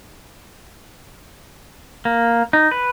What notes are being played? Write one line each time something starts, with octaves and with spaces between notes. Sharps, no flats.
A#3
D#4
B4